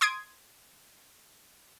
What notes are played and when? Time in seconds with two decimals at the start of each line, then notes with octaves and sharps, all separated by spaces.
0.01 C6 D#6 G#6 D7